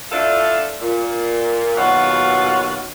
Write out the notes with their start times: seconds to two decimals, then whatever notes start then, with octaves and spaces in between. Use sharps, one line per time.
0.12 A3 D4 E4 F4 A4
0.82 A#2
1.77 D#2 B2 F#3 F4 F#4